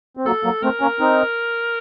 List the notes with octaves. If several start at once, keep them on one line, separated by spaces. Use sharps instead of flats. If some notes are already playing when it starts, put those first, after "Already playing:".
C4
F#3 A#3 A4
F#3 A#3
A3 C4 A#4
A#3 C#4
C4 D#4